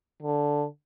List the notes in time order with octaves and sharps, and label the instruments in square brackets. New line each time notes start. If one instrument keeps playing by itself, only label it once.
[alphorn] D3